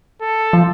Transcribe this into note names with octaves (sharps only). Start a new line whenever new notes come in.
A4
F3